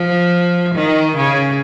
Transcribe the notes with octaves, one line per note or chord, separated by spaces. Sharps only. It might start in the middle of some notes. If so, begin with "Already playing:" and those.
Already playing: F3
D#3
C#3